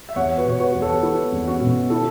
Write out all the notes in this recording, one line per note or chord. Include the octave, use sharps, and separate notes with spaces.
E5
E2 C#5 F#5
F#4 B4
B2 C#5
F#4 B4
E2
A4 C#5
B3 E4 A4
E2
C#4 F#4
B2
E4 A4